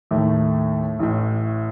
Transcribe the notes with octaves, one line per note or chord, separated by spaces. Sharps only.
D#2 A2 D#3 A3
A1 A2